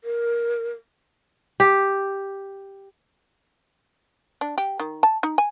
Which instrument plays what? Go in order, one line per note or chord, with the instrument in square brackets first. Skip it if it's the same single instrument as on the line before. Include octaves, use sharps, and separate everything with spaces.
[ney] A#4
[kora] G4
[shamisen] D4
G4
D#3
A5
D#4
G#5